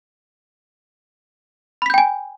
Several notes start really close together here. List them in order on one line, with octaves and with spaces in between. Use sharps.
B5 B6 G6 G5 G#5